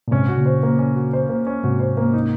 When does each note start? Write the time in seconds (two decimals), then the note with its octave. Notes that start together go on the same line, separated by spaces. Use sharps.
0.08 A#2
0.11 G#2 C3 C#4
0.28 F#4
0.37 A#2 C#3
0.46 C5
0.63 A#3
0.79 C#4
0.96 F#4
1.13 C5
1.29 A#3
1.47 C#4
1.63 G#2 C3 F#4
1.80 C5
1.97 A#3
2.13 D#4